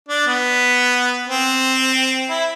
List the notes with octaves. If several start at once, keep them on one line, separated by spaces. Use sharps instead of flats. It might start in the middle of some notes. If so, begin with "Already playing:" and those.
D4
B3
C4
E4